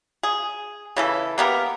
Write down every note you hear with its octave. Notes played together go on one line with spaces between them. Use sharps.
G#4
C#3 E3 A4
A#3 B3 G4 A#4